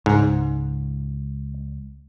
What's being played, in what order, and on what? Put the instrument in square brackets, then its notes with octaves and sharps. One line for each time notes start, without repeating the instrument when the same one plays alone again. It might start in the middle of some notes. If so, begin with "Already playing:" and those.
[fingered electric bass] C#2 [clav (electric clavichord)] G#2